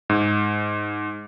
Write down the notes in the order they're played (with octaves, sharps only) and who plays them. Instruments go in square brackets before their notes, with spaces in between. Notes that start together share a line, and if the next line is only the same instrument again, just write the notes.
[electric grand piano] G#2